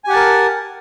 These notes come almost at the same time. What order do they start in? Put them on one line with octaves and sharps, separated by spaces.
G#5 G4 F#5 A5 A#4